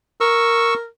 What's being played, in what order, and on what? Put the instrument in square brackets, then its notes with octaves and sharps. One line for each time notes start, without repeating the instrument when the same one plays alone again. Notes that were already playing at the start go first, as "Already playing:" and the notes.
[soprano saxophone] A#4 [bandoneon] C#6 E6